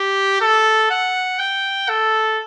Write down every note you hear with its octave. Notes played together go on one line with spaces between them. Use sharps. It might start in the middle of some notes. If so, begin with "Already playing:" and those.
Already playing: G4
A4
F#5
G5
A4